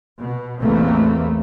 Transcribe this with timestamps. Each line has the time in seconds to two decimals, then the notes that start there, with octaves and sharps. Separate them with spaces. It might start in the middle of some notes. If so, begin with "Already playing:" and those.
0.18 B2
0.59 A1 E2 E3 A3 A#3 C4